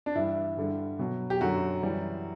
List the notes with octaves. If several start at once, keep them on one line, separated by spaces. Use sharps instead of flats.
D4
G2 E3 G3 E4
G2 D3 G3
B2 F#3
G4
F#2 D3 F#3 F#4
F#2 E3 G3